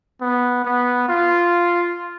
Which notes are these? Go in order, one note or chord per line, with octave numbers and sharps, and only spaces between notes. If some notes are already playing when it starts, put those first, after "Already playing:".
B3
B3
F4